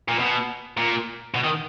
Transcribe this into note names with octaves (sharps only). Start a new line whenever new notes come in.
A#2
B2
A#2
B2
D#3